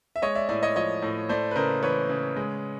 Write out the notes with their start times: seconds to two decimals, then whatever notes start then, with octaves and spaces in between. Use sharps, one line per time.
0.16 E5
0.22 G#3 C#5 D#5
0.35 D5 E5
0.49 A2 D5 E5
0.63 C#5 D#5
0.76 F3 C#5 D#5
1.02 A2
1.29 A3 C5 D5
1.51 B4
1.56 C#3 A#4 C5
1.83 E3 B4 C#5
2.09 C#3
2.36 G#3